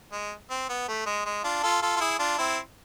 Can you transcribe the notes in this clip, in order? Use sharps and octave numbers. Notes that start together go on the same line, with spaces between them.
G#3
C4
B3
A3
G#3
G#3
D4 F4
F4 A4
F4 A4
F4
E4 G#4
D4 F4
C4 E4